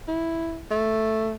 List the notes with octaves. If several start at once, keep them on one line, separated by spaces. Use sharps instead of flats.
E4
A3